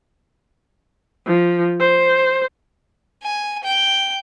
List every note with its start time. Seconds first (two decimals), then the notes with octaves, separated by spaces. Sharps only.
1.26 F3
1.80 C5
3.23 G#5
3.63 G5